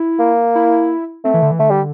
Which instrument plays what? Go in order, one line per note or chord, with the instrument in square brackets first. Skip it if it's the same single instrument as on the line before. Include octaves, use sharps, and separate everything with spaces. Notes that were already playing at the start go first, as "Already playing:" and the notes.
Already playing: [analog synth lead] E4
[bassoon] A#3
[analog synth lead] E4
[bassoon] A3 [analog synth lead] C4
[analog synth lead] E3
D3
E3
[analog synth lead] D3 [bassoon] A3
[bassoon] G3